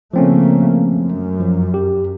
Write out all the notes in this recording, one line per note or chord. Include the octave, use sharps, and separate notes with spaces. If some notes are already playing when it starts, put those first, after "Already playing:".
C#3 F3 A3 A#3 C4 C#4
F#2
F3
G4